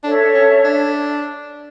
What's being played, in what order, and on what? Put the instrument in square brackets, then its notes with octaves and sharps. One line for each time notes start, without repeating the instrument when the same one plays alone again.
[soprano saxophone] D4 [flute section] A4 C#5 E5
[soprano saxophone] C#4
D4